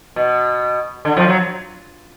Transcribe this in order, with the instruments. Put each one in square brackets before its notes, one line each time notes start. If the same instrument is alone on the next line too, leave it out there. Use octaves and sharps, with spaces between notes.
[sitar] B2
D3
F2 F3
F#3